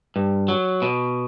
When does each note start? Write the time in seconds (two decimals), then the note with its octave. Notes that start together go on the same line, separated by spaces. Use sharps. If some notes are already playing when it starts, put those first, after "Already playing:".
0.16 G2
0.48 F#3
0.82 B2